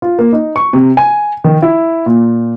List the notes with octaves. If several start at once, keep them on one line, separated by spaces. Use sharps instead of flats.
F4
A#3
D#4
C#6
C3
G#5
D#3
E4
A#2